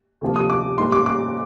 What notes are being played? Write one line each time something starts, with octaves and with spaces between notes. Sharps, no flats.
D2 C3 F3 A#3
D#6
D6
G#2 G3 A#3 C6
D6
D6